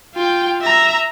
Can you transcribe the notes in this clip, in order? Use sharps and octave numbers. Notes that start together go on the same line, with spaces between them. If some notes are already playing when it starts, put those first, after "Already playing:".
F4 G5
E5 A#5